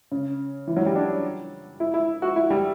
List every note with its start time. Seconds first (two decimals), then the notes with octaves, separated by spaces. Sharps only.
0.12 C#3
0.67 E3
0.77 F#3
0.86 G3
0.96 D4
1.80 E4
1.94 E4
2.22 F#4
2.36 E4
2.50 G3